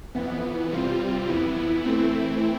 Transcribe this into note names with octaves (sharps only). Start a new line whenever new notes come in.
F2 E3 B3
C3 G3 C4 F4
F2 E3 B3 E4
E3 A3 C4 E4